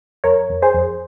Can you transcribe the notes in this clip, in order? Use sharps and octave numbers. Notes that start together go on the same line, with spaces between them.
F2 A#4 C#5
F2
G#4 C5
F2